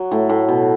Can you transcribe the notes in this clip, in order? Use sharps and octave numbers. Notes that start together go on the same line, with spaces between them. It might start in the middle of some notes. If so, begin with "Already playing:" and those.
Already playing: F#3
A2
A2
B2